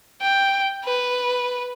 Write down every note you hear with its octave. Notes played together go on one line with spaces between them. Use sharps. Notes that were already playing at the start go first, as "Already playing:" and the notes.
G5
B4